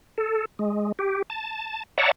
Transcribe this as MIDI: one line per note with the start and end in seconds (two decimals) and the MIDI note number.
0.18 0.45 69
0.59 0.92 56
0.99 1.22 67
1.30 1.83 81
1.98 2.11 73
1.98 2.11 74
1.98 2.11 76
1.98 2.11 78
1.98 2.11 81
1.98 2.11 82